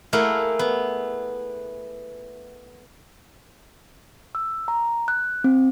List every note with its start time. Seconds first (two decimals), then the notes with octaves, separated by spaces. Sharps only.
0.13 A3 A#3 E4 G#4 A#4 F#5
0.59 B3
4.35 E6
4.68 A#5
5.08 F#6
5.44 C4